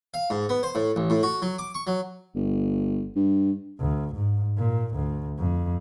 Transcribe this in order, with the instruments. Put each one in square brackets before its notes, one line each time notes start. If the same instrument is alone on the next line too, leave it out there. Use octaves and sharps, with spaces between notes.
[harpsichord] F5
G#2
B3
C5
A2
A1
A2
F#4
F#3
D6
C#6
F#3
[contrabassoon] G1
G2
[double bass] D2
G#2
A#2
D2
F2